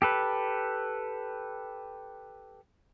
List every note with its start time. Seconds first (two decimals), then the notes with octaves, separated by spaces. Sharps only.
0.02 G4 A4 B4